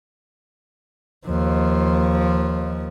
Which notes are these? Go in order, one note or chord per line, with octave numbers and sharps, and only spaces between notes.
D#2 F3